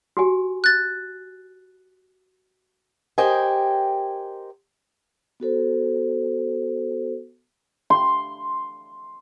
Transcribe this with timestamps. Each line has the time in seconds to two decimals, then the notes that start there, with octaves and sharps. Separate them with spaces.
0.17 F#4 G4 G#5
0.64 F#6 A6
3.18 G4 A#4 C5 D#5 G5 G#5
5.40 B3 F#4 A4 C5
7.90 C6